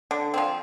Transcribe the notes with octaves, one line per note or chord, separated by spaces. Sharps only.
D3
F3 C4